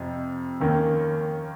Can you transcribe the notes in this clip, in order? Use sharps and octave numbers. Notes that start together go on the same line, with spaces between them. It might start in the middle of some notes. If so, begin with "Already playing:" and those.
Already playing: F2 C3
D#2 D#3 A#3 C#4